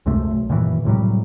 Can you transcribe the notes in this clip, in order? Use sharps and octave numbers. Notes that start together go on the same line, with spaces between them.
C#2 F#2 C3 A3
B1
F#2 A#2 D#3 E3
A2 C3 F#3 G3